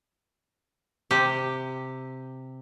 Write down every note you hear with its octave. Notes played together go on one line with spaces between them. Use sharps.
C3 G4